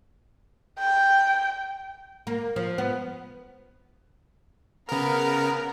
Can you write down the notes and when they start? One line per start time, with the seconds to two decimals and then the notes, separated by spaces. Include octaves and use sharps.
0.79 G5
2.27 A#3
2.56 F3
2.78 B3
4.89 C#3 B3 A#4 A#5